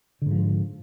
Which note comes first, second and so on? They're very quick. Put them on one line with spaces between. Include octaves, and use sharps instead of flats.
D3 G#2 F3